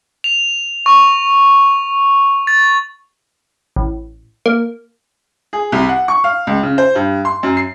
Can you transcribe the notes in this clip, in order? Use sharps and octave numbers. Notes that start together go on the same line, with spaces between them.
F7
C#6
A6
A1
A#3
G#4
C2
F#5
C#6
F5
C#2
C#3
C5
G2
C6
F#2
C7